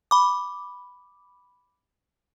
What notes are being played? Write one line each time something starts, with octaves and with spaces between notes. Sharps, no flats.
B5 D6